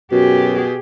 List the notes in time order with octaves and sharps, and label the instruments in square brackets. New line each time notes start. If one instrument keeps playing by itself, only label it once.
[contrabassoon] F#2 [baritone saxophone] B2 [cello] G4 G#4